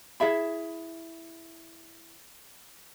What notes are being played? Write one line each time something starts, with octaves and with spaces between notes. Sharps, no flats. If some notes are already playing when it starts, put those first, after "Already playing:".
E4 G#4 E5 B5